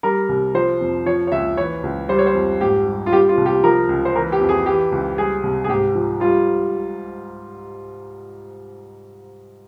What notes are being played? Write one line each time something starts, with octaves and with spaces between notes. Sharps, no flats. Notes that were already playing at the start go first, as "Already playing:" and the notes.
G3 A#4
C2
F3 C5
F2
F3 C#5
C#5
C#2 E5
E3 C#5
C#2
G3 C5
C#5
C5
F2
G#2 G4
G3
F4
G3 G4
F4
C2
G4
F3 A#4
C#2
C5
E3 A#4
G4
F2
G#4
E3 G4
C#2
G3 G#4
C2
G#4
G#2 G4
F3
G3 F4